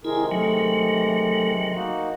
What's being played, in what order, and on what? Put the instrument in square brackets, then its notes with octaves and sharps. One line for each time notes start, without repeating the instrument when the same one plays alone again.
[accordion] C3 D#3 G#3 [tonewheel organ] E4 [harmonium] G#4 A#4
[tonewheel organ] F#3 [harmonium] A3
[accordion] A#3 D#4 F#4